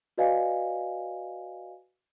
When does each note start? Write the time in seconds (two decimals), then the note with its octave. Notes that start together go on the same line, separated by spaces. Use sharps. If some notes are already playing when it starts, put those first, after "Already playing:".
0.18 F#4 B4 D5 D#5 F5 G#5